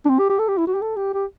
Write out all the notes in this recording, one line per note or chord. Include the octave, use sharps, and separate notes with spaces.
D4
C4
G4
G4
A4
G4
E4
F#4
G4
A4
G4
G4